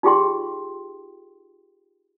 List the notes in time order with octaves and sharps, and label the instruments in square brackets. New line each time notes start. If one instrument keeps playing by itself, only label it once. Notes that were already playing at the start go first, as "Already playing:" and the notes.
[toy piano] D#4 F4 G4 G#4 G5 C6